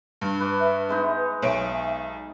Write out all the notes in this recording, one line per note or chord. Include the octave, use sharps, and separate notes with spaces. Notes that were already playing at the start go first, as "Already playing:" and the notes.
G2
B4 D6
E5
G#3 B3 D#4
B1 C#5 E5 D7